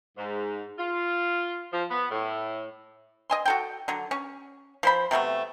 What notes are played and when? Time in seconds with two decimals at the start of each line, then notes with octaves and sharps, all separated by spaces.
0.17 G#2
0.78 F4
1.72 F3
1.90 B3
2.11 A2
3.30 D#5 G#5 C6
3.45 F#4 A4 G5
3.88 D3 F#3
4.11 C#4
4.83 F3 C5 B5
5.11 C3 F#3 A3 B3